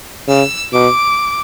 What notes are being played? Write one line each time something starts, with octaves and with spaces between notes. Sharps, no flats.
C#3 E6
B2 D6